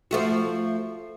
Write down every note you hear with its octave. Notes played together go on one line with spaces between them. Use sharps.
F3 A3 F#4